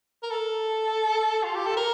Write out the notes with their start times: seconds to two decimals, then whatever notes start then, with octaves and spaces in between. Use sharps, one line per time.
0.23 A#4
0.31 A4
1.44 F4
1.55 G4
1.67 A4
1.77 A#4